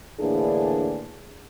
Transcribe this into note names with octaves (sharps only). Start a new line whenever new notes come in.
A2 D3 E3 A#3 D4 G#4